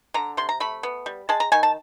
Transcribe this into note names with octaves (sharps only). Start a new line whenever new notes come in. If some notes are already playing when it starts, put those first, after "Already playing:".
D3 A#5
C3 C6
A#5
A3 B5
B3
G3
G#3 A5
A#5
D#3 G#5
A5